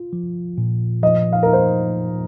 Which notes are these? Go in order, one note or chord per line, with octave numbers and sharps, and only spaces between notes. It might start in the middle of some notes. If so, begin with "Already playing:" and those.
Already playing: F4
F3
A#2
F3 D#5
F5
D#4 A#4
C5